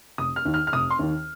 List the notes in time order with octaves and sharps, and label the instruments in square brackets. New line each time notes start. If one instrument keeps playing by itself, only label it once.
[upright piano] F1 D#6
F6
D#2 D#3
F6
F6
F1 D#6
C6
D#2 D#3